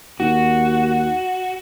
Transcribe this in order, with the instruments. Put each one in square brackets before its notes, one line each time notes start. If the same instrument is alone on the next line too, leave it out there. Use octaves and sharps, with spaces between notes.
[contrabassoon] D#2 [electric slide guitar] F#4